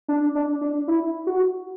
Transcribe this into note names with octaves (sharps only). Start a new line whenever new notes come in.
D4
D4
D4
E4
F#4